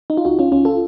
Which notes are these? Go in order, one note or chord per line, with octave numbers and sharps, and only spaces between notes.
D#4
F4
C#2 D#4 F#4
C#4 F4
C#2 C#4 F4
F4 A4